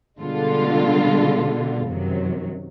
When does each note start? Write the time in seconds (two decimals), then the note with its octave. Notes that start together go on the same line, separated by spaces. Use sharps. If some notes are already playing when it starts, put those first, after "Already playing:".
0.20 B2 D3 G3 G#3 F4 A4
1.86 F#2 C3 D#3 F#3